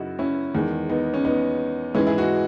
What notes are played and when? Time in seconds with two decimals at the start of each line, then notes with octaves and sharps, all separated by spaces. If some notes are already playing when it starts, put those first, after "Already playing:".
Already playing: F#2 C#3 D#4 E4 F#4
0.19 C#4 E4
0.55 E2 D#3 G#3
0.90 B3 D#4
1.14 C#4
1.25 B3 D#4
1.95 G#2 E3 G#3 C#4 E4
2.07 E4 G#4
2.18 D#4 F#4